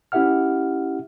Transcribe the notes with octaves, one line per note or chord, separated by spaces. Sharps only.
C#4 E4 G4 E5 F#5 F6